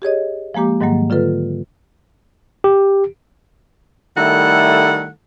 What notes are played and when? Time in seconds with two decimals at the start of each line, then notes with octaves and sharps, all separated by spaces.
0.02 G4 G#4 C#5 D#5
0.54 F3 G#3 A#3 G4 D6
0.81 G#2 D#3 F#3 G3 A#3
1.10 D3 F4 A4 B4
2.64 G4
4.17 D#3 G3 A3 E4 A4 F#5